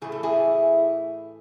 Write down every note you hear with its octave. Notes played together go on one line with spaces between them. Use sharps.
A2 E3 A3 G#4
A4
E4 G#4